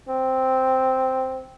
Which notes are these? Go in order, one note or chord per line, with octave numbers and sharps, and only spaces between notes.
C4